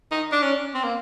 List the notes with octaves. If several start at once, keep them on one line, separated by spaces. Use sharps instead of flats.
D#4
D4
C#4
C4
A#3